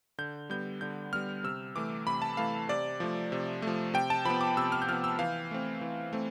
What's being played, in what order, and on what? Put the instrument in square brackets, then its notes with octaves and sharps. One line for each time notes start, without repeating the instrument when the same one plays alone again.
[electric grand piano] D3 G6
G3 B3 G6
D3 G6
G3 B3 F6
C3 E6
E3 A3 D6
C3 B5
A5
E3 A3 F5
C3 D5
F3 A3
C3
F3 A3
C3 G5
A5
F3 B3 B5
D6
C3 E6
F6
G6
F3 B3 F6
E6
E3 F5
A3 C4
E3
A3 C4